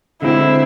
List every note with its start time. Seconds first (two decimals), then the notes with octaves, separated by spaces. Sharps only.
0.22 D3 G#3 C4 E4